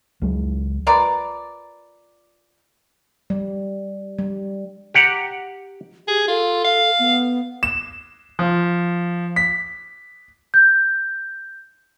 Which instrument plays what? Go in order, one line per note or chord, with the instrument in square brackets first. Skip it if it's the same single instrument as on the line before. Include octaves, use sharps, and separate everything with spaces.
[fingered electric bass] C#2 F#3 G#3
[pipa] F4 A#4 B4 D5
[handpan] G3
G3
[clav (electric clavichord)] G4 F#5 A#5
[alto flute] G4 [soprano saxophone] G#4
[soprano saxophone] F4 [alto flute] A4
[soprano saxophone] F5
[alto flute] B3
[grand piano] E7
F3
B6
[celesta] G6